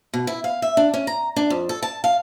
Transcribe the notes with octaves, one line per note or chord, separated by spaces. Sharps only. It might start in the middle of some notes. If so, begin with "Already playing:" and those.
B2
E4
F5
E5
D4
C#4
A#5
D4
F2
A4
A5
F5